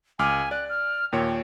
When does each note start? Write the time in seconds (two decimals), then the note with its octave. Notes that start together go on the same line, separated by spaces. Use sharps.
0.19 C#2 G#5 D6 F6
0.51 D5 F#6
0.69 F6
1.12 D#2 A#2 C#5 G5